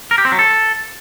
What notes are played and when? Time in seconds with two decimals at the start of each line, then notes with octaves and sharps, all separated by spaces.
0.11 A#4
0.18 G4
0.25 C4
0.32 F#3
0.39 A4